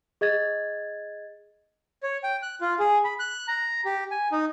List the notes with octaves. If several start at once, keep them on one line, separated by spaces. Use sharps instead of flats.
G#4 D#5 G#6 A6
C#5
G5
F#6
F4
G#4
B5
F#6
A#5
G4
G#5
D#4